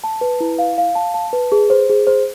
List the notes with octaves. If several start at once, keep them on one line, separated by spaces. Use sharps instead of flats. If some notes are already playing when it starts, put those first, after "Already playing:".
A5
B4
E4
F5
F5
A5
A5
B4
G#4
C5
G#4
C5